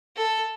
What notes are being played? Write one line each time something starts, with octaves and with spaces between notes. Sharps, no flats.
A4